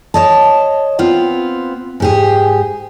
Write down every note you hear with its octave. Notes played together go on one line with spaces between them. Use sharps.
C#5 D#5 A5
B3 C4 F4
G#2 G4 G#4